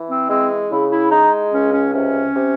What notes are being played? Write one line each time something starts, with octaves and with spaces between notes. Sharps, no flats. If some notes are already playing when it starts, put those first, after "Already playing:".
Already playing: E3
C4
G#3 C4
C#3 E4
E4
G#3 D#4
C#2 C#4
C#4
C3 C#4
C3